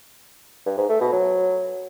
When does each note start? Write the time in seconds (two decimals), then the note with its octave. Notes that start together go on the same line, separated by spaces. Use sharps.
0.66 G2
0.78 G#2
0.89 A3
1.01 B2
1.12 F#3